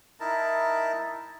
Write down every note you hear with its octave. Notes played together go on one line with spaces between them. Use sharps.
D#4 E4 A#4 A5